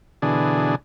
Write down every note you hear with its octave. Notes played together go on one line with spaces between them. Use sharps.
B2 D3 E3 D4 G#4